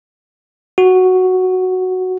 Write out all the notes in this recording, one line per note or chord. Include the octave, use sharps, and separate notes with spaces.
F#4